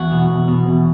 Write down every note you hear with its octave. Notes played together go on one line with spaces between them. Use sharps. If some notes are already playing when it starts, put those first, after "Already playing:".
Already playing: E2 F#4
B2
E2
B2
E2